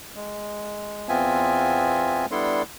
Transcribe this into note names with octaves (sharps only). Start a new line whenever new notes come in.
G#3
E2 B3 C4 F4 E5 G#5
G3 B3 D4 E4 A4 C6